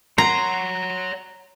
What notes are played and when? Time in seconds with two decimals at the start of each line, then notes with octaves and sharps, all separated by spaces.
0.18 C#5 F#5 A#5 C6